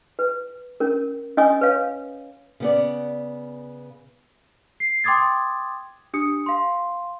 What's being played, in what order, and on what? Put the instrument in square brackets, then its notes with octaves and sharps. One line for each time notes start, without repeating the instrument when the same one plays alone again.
[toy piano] B4
C#4 A#4
C#4 D#5 G#5 D#6
B4 C#5 F5
[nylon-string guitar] C#3 B3 D5
[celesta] C7
G5 C6 D6 D#6 G#6 A6
D4 G4 D#6 C#7
F5 C6